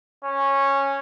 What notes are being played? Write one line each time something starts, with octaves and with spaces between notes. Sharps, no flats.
C#4